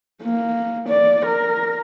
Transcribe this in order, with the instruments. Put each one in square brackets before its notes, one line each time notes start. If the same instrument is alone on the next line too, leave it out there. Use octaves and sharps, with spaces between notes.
[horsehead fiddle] A#3
D5
A#4